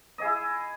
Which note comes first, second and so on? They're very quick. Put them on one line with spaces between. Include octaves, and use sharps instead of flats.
D#5 G#4 E4